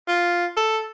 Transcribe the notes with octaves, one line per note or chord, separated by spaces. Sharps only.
F4
A4